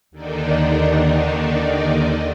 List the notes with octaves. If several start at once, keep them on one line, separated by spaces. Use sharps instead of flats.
D#2 D3 D#3 D4 D#4